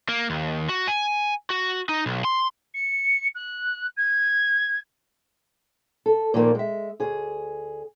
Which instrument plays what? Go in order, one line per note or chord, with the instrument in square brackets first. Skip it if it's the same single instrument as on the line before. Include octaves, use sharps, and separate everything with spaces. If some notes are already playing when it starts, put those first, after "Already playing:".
[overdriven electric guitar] A#3
D#2
F#4
G#5
F#4
D#4
B1
C6
[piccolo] C#7
F#6
G#6
[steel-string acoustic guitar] A4
A#2 D#3 F3 A#3 F4
G#3 E5
D2 G#4